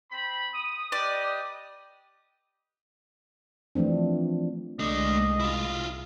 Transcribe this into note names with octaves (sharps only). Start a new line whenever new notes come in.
C4 B5
D#6
G4 B4 D5 D#5
E3 F3 A3 C4 D4
C2 G#3 A3 D4 D#5
E4 F4